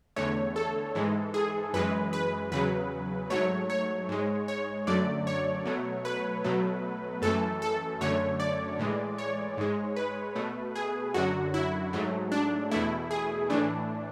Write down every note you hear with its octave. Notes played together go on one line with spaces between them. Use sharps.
E2 D3 A3 C#5
A4
G#2 E3 G#3
G#4
F#2 E3 G#3 B4
B4
E2 C#3 F#3 B4
G#2 F#3 A3 C#5
C#5
G#2 G#3
C#5
F#2 D3 F#3 A3 D5
C#5
B2 F#3 A3
B4
B2 F#3 A3
F#2 E3 A3 A4
A4
F#2 D3 A3 C#5
D5
A2 E3 G#3
C#5
G#2 G#3
B4
B2 A3
G#4
F#2 D3 F#3 F#4
E4
G#2 F#3 A3
D4
E2 B2 A3 E4
G#4
A2 E3 A3 D4